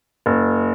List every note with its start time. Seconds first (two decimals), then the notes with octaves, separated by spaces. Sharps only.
0.26 F#1